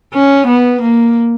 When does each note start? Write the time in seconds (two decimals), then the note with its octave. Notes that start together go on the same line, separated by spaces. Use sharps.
0.14 C#4
0.47 B3
0.82 A#3